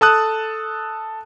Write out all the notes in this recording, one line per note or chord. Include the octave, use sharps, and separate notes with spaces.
A4 A5 D#6 F#6